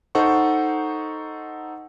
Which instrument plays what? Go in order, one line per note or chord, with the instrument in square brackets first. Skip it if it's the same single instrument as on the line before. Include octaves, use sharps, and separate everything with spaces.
[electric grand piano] D#4 A4 C5 F#5 C#6